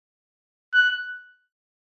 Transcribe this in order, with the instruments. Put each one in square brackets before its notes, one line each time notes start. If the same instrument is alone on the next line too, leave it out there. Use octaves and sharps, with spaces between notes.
[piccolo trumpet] F#6